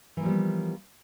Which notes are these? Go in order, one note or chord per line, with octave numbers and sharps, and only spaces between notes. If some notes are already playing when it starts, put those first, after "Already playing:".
E3 F3 G3 A#3 B3